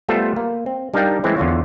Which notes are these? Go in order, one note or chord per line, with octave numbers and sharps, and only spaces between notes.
G3 A3 B3 F4 A4 C5
A#3
C4
G3 D4 D#4 A#4 F5 G5
E3 G#3 A3 C4 C#4 E4
E2 D3 F4 C#5